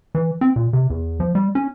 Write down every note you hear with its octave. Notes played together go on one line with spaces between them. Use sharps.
E3
C4
A#2
C3
E2
F3
G3
C#4